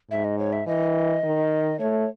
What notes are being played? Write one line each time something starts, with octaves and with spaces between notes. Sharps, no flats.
G#2 E5
D#5
C#5
E5
E3 D#5
D#3
A3 C#5